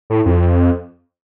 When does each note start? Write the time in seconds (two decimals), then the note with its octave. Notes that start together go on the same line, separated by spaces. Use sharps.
0.10 A2
0.26 F2